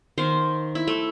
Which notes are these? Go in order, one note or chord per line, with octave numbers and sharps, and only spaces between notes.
D#3 C5 F5
E4
A3